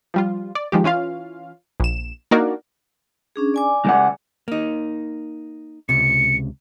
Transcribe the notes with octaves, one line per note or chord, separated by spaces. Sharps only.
F3 G3 F4
D5
D#3 F3 G#3 G4
E3 C#4 F4 F5
A#1 E7
A#3 D4 D#4 F#4 A#4 D5
C#4 D4 G#4
D5 G#5 D6
C#2 G#3 F#5
A#3 D#4
C#2 C3 C#7